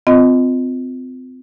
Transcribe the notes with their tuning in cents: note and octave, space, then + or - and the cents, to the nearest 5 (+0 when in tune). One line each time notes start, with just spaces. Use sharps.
C4 -35 F4 +10 D#5 +0